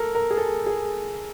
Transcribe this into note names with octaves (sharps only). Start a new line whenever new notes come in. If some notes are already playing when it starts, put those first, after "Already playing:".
Already playing: A4 A#4
A#4
G#4
A4
G#4